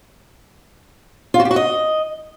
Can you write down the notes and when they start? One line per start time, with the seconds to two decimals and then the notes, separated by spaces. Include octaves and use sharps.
1.34 F4
1.40 F#4
1.45 G4
1.51 F#4
1.56 D#5